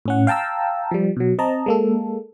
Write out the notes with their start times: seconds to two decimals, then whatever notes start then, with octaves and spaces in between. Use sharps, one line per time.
0.06 A2 C#4 F#5
0.27 F5 G5 A5 A#5 E6
0.91 F3 G3
1.17 B2 F#3
1.39 C4 D#5 A5 A#5
1.66 G#3 A#3 A4